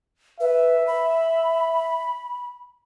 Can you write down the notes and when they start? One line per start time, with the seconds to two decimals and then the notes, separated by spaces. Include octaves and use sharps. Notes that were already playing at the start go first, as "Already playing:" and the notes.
0.40 B4 E5
0.87 B5